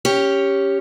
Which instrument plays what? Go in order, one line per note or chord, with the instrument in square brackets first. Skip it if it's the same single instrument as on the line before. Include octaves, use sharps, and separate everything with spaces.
[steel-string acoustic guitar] C#4 G4 C#5